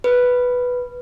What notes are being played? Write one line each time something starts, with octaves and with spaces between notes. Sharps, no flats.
B4